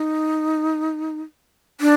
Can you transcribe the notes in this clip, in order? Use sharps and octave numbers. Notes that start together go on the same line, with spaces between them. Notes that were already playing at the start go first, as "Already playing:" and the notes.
Already playing: D#4
D4